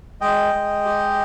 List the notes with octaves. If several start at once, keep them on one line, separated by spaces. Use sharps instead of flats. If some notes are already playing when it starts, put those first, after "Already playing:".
G#3 D#5 G5
G#3
G4